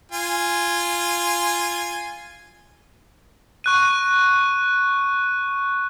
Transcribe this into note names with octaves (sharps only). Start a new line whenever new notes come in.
F4 G#5
C#6 F#6 D#7